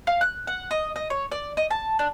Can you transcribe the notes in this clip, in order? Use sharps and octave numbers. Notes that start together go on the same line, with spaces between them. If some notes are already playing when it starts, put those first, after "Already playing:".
F5
F#6
F#5
D#5
D#5
C#5
D5
D#5
A5
D4